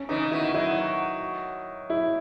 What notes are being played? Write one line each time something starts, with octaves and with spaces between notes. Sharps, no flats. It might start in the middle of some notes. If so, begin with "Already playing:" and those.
Already playing: C#4
C#3 E3 D#4
B2 D#3 E4
D#3 F#3 E4
E4